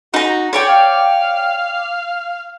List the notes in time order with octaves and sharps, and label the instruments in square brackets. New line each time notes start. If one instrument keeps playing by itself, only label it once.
[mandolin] D#4 A#5 [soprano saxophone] F#4
[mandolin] C#5 D5 G5
[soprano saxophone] F5